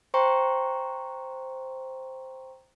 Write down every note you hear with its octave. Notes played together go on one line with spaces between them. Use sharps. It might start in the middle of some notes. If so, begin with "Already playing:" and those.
C5 G5 A#5 C6 C#6